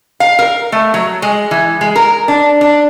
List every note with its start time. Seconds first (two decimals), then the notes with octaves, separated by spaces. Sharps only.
0.20 F5
0.39 A#4
0.72 A3
0.94 F#3
1.22 G#3
1.51 E3
1.81 G#3
1.96 A#4
2.28 D4
2.61 D4